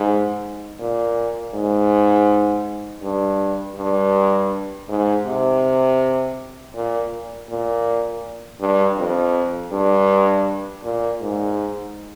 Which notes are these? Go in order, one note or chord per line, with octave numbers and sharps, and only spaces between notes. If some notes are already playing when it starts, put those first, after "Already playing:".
Already playing: G#2
A#2
G#2
G2
G2
G#2
C3
A#2
A#2
G2
F2
G2
A#2
G#2